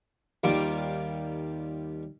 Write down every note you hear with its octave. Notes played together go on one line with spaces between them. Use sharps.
D#2 G3 A#3 F4 A#4 D6